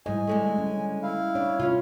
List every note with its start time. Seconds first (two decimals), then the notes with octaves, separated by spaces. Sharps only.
0.06 G#2 G3 E4 D#5 G#5
0.27 D3 G#3 A3
0.58 C#4
1.03 E4 F5
1.35 D4 C#5
1.60 C3 C#4 F4